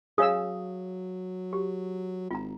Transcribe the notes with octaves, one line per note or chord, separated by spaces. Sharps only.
F#3 G#4 C#5 F5 D#6 E6
G4
G#1 F4 A#5